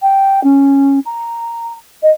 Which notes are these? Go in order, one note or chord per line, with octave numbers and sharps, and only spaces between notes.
G5
C#4
A#5
D#5